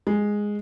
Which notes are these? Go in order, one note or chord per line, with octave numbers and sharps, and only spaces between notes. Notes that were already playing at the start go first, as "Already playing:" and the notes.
G#3